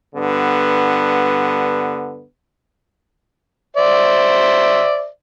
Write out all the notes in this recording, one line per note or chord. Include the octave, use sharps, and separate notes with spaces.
G2 D3 B3
C5 D5 E5